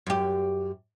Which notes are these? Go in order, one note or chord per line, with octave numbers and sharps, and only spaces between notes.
F#2 G4